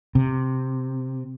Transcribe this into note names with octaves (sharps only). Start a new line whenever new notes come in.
C3